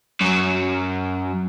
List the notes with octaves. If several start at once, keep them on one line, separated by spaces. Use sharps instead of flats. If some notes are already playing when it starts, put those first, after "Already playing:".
F#2 F#3